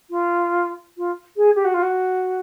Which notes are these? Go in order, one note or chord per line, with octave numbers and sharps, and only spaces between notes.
F4
F4
G#4
G4
F#4
F4
F#4